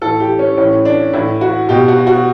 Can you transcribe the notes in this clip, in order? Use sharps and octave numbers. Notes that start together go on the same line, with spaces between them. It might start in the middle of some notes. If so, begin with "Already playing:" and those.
A2 E3 A4
G4
C#4
A2 E3 C#4
D4
A2 E3 E4
F#4
B2 G4
F#4
F#4